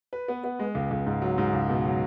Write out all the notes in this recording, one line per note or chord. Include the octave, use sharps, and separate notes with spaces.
B4
B3
B3
G#3
C#2
C#2
G#2
F#3
G#2
C#2
B2
F#3